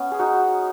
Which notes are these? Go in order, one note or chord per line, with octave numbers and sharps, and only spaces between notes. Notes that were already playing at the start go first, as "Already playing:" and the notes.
Already playing: B3 C#4
G#4
D#4 F#4